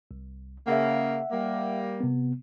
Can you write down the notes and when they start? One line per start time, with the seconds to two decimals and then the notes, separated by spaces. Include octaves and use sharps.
0.11 C2
0.67 C#3 A#3 E5 F#5
1.32 G3 A#3
2.00 C3 B3